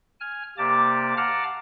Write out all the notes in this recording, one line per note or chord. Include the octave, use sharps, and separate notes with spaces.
G#5 F6
C3 A#3 G4 D5 A5 D6
F5 F#5 A5 A#5 D6 F6